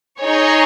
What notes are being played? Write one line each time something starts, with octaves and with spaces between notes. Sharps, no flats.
D#4 G#4 C#5